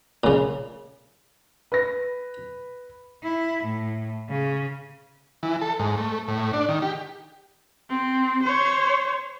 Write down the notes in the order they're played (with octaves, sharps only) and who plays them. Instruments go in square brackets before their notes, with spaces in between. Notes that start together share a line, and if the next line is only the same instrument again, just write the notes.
[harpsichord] A#2 C#3
[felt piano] B4 A#6
[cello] E4
A2
C#3
[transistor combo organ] E3
A4
G#2
A3
A2
D4
D#3
G4
[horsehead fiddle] C4
C5 C#5